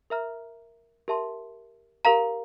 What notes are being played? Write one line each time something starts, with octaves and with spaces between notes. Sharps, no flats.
A#4 E5 A#5 F6
G4 A#4 E5 A5 C6
G4 A#4 F5 A#5